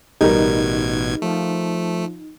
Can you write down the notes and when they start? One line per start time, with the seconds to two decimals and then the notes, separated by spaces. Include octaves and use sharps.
0.21 A1 B2 G3 D#4 A#4 G#6
1.22 F3 A3